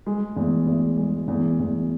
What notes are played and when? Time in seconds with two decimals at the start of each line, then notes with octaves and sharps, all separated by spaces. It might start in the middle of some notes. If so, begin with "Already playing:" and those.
0.06 G#3
0.36 E2
0.67 E2
0.98 G#3
1.28 E2
1.60 E2